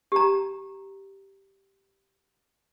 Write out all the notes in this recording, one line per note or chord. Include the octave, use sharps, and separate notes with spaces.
G4 A#5